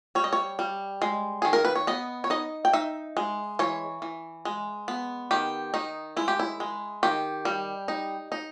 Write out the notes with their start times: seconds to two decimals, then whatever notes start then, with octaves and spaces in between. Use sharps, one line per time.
0.15 G3 C#5
0.24 D#5
0.33 C#5
0.59 G3
1.02 G#3
1.42 D#3 G#4
1.53 A#4
1.65 B4
1.76 C#5
1.87 B3 D#5
2.24 C#5
2.30 D#4 D#5
2.65 G5
2.73 D#4 E5
3.17 G#3
3.59 E3 C#5
4.02 E3
4.45 G#3
4.88 B3
5.31 D#3 G4
5.74 D#3 D#4
6.17 G#3 E4
6.28 G4
6.40 E4
6.60 G#3
7.03 D#3 G4
7.45 G3
7.88 D#4
8.32 D#4